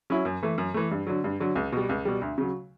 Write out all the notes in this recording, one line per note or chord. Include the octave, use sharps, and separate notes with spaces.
F#3 C#4 E4
F#2
E3 A3
F#2
E3 A3
G2
D3 F#3
G2
D3 F#3
C#2
B2 G3
C#2
B2 G3
D2
C#3 F#3